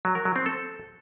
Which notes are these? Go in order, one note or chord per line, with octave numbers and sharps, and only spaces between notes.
F#3
A#4
F#3
C4
A4